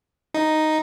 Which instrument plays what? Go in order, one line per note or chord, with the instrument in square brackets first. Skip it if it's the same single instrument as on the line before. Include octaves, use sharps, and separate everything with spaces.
[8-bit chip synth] D#4